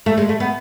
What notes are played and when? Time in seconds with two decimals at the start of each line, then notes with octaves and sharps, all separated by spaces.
0.06 A3
0.18 G#3
0.29 A3
0.40 B3